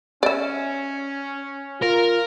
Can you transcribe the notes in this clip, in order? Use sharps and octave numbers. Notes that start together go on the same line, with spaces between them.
C#4 D5 E5
F4 A#4